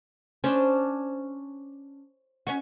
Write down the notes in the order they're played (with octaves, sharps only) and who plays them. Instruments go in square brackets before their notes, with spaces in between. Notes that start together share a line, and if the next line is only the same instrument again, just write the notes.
[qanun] C#4 D4 [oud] C5
[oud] C#4 F#4 [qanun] C#6